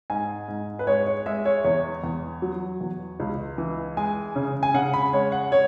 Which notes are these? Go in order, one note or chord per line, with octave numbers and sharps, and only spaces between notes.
G#2 G#5
G#2
B4
G#3 C#5
C#5
G#3 E5
C#5
E2 C#5
E2
F#3
E2
C#2
E3
G#3 G#5
C#3
G#5
C#3 F#5
B5
G#3 C#5
F#5
C#5